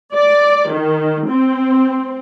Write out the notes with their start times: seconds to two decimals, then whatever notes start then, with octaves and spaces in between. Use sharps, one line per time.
0.16 D5
0.71 D#3
1.30 C4